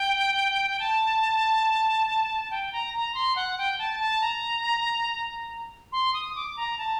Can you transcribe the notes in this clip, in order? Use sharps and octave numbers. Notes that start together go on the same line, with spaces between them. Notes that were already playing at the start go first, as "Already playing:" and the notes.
Already playing: G5
A5
G5
A#5
A#5
C6
F#5
G5
A5
A5
A#5
C6
D#6
D6
A#5
A5